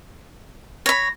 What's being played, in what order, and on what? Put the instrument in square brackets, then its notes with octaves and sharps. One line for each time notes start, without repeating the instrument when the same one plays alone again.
[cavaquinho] C#5 B5 [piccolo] A#6